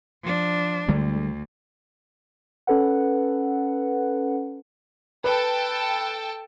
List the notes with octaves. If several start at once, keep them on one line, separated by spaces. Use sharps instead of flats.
F3 D4
D2 D3 G3 G#3
C#4 A4 B4 F#5
A4 B4 G5 A5